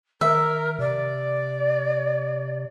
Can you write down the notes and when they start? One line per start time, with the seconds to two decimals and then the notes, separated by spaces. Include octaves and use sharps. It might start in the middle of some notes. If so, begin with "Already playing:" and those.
0.21 D#3 A#4 E5
0.79 C3 D5